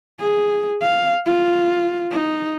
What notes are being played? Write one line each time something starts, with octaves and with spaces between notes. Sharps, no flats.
G#4
F5
F4
D#4